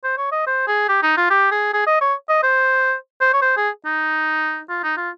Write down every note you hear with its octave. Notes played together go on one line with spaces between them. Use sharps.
C5
C#5
D#5
C5
G#4
G4
D#4
F4
G4
G#4
G#4
D#5
C#5
D#5
C5
C5
C#5
C5
G#4
D#4
F4
D#4
F4